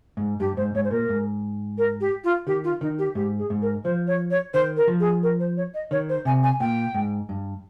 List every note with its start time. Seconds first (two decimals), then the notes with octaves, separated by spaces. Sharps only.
0.17 G#2
0.40 G2 G4
0.57 G#2 C5
0.75 G#2 C#5
0.84 C5
0.91 A#2 A#4
1.09 G#2
1.78 A#4
2.00 G4
2.24 F4
2.47 D#3 G4
2.64 F4
2.81 D#3 D#4
2.98 G4
3.15 G#2 G4
3.39 G#4
3.50 G#2
3.62 A#4
3.84 F3 C5
4.07 C#5
4.30 C#5
4.54 D#3 C5
4.77 A#4
4.87 F3
5.00 G#4
5.23 A#4
5.40 C5
5.57 C#5
5.74 D#5
5.91 D#3 C#5
6.09 C5
6.25 C3 G#5
6.43 G#5
6.60 A#2 G5
6.94 G#2
7.29 G2